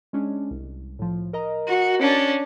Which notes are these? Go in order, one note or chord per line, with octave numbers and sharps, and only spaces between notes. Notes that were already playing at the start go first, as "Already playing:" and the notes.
G#3 C#4 D4
C2
A2 F3
A#4 D#5 A#5
F#4
C#4 D4